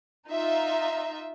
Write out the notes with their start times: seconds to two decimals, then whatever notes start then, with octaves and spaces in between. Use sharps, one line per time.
0.28 D#4 F4 E5